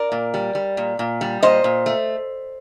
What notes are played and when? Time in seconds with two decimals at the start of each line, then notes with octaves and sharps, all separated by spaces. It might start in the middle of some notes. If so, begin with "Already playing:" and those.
Already playing: A#4 D5
0.12 A#2
0.34 G3
0.55 G3
0.77 A#2
0.99 A#2
1.21 G3
1.43 A#2 C5 D#5
1.64 A#2
1.86 A3